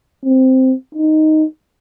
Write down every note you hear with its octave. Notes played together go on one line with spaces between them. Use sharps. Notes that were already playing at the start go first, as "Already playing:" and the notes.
C4
D#4